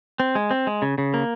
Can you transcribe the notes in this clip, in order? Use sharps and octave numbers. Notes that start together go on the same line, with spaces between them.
C4
G#3
C4
G#3
C#3
C#3
A#3